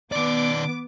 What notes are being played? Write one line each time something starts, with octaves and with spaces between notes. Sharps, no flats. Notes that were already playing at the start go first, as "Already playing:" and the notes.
D#3 B3 D5 D6